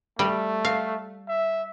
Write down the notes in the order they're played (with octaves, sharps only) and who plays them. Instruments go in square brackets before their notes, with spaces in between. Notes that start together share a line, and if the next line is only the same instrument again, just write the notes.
[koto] G3 [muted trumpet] A3
[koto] F5
[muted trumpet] E5